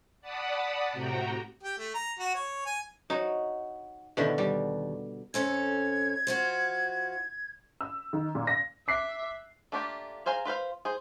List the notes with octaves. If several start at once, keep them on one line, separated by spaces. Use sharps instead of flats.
D5 F#5 A5 B5 D#6
A2 C3 F#4 G5 A#5
G4
A3
A#5
F#4
C#5
G#5
D#4 F#4 C#5
B2 D3 D#3 E4 G4
D#2 G3
F2 C#4 A4 G#6
F3 F4 F#4
E6
D#3
A#2
A#6
E5 D6 F#6 C7
A3 A#3 D4 F4 G4
G#4 C5 F5 G#5 A#5
F4 B4 C5 F5
G#4 C5